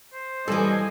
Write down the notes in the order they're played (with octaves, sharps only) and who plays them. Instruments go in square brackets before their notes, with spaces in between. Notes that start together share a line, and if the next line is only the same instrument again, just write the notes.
[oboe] C5
[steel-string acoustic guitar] E3 G3 [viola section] F3 D#5 G#5 [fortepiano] A4